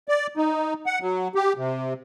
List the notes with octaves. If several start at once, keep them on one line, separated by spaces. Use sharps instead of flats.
D5
D#4
F#5
F#3
G4
C3